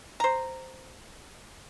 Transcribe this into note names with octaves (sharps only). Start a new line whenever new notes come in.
C5 A#5